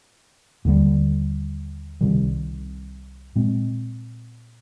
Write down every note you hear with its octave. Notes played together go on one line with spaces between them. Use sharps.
D#2 D3 G3
C2 C3 D#3 G3
A#2 G#3 C4